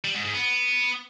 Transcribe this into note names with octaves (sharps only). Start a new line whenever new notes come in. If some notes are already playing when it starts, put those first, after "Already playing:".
G3
G#2
G#2
B3